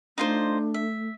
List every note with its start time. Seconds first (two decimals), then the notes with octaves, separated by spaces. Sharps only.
0.18 A3 D4 D#4 F4 C5
0.74 E5